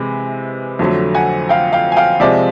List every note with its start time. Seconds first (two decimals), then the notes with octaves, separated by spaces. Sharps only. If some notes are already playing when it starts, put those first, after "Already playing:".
Already playing: C3 E3 G#3
0.79 F2 D3 F#3 A3
1.15 F#5 G#5
1.49 F5 G5
1.73 F5 G5
1.92 G#5
1.96 F5 G5
2.20 C3 F3 G#3 D5 E5